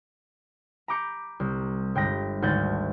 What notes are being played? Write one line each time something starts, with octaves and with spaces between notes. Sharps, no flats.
A#5 B5 D6 G6 C#7
C2
G1 G#3 G5 B5 A#6
G#1 D2 F#5 G6 A6